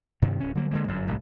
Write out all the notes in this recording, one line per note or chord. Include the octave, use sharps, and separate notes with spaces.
G2 C3 D#3
D1 C#4
D3 F#3 G3 A#3
D3 G#3 A#3
G1 F#2
G1 C2 A2 F#3